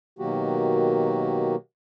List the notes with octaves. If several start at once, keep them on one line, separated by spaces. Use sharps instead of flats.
B2 D#3 F#3 A#3 F#4 G4